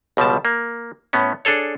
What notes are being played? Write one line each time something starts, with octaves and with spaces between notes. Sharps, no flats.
C#2 B2 F3 G3 A5
A#3
A2 B3 C#4
D4 G#4 A4 C#5